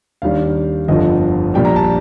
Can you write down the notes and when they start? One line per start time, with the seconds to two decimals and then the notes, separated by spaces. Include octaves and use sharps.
0.22 D#2 D#3 G3 D4 F5
0.88 G1 F2 D3 F3 D#5
1.54 A#1 A#2 G3 D4 G5
1.65 A#5
1.76 A5